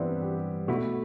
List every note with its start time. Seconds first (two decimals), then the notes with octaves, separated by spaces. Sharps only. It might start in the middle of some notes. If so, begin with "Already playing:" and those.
Already playing: G2 E3 G3 B3 C4 D4 E4
0.22 G4
0.68 B2 A3 E4 F#4